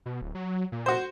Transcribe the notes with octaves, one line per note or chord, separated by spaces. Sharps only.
B2
D1
F#3
A#2
F#4 C5